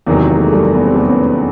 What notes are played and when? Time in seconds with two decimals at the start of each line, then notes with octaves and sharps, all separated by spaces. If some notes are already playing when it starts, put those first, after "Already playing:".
0.07 E2 C3 D#3 F#3 G#3 A#3
0.30 A#3
0.37 A3
0.44 G#3 A#3
0.52 G3 A3
0.75 B3
0.85 C4
0.95 A3 B3
1.09 B3 C#4